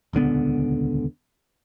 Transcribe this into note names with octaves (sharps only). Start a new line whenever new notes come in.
D#1 C#2 D3 B3